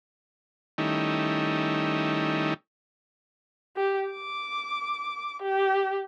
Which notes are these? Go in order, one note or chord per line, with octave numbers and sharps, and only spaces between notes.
D#3 G3 A3 C#4 D#4 E4
G4
D6
G4